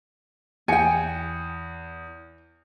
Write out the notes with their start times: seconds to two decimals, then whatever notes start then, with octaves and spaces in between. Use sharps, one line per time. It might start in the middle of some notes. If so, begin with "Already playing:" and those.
0.68 E2 G5 G#5 C#7